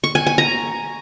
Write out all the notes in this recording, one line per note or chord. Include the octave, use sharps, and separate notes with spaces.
C#6
G#5
G#5
A#5